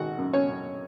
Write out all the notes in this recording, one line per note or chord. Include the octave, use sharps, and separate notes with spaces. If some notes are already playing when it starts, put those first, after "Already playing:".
Already playing: G#1 F#4 F#5
F#2
C#4 C#5
F#2